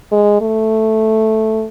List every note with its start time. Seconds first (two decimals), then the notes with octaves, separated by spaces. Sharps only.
0.12 G#3
0.41 A3